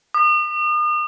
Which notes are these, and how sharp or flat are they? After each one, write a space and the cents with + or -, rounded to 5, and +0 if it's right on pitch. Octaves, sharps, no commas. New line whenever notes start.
D#6 -40